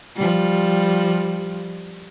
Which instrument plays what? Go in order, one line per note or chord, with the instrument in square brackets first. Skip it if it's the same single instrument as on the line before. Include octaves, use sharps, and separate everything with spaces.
[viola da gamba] F3 G3